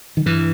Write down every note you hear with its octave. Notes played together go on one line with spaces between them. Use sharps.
D#3
G2 E3